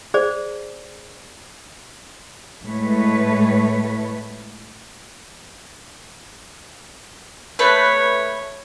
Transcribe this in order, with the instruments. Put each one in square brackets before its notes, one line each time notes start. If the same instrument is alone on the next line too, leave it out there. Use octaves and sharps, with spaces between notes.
[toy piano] G#4 C5 D5
[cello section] A2 G#3 A3 B4 C#5
[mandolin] A3 B4 [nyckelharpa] C#5